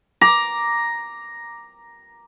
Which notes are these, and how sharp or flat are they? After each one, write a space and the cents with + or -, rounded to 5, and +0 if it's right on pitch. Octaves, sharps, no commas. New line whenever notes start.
A#5 +5 D6 +0